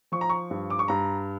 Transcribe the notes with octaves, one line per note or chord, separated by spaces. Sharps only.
F3 C#6
A#5
C#6
G2
D6
C#6
G2 A#5